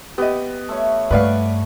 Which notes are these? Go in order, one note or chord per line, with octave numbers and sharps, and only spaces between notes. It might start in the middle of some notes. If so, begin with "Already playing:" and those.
B3 G4 D#5
A3 C#5
G2 A3 B4 D5 F5 F#5 C#6